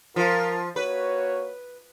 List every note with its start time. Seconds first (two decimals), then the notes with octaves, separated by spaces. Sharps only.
0.16 F3 F4 A#4
0.76 A#3 F#4 B4 C#5